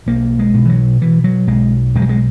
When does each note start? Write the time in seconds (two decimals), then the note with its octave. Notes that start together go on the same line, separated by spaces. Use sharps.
0.06 B1 A#3
0.39 G#3
0.54 B2
0.65 E3
0.69 F#3
1.01 B2 E3
1.24 F#3
1.47 B1 G#3
1.95 B1 G#3
2.02 F#3
2.09 G#3